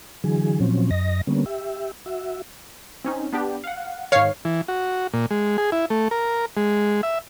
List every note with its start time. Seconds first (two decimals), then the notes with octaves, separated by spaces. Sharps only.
0.24 D3 E3 F#3 G#4
0.60 A#2 F3 F#3 C4 C#4
0.91 F#2 D#5 A#6
1.27 D3 G3 A#3 B3 C#4
1.46 G4 E5
2.06 F#4 E5
3.05 C4 C#4 D#4
3.33 B3 D4 G4
3.64 F5 F#5
4.12 G#2 D#3 C#5 F5 C7
4.45 E3
4.68 F#4
5.13 A#2
5.31 G#3
5.58 G#4
5.72 E4
5.90 A3
6.11 A#4
6.57 G#3
7.03 E5